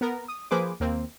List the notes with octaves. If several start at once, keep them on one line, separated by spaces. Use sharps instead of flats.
B3 A#4
D#6
F3 A#3 G#4 B4 C5 D6
D#2 A#3 C4